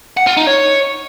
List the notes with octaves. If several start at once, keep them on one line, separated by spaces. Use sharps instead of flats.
F#5
F4
D#4
C#5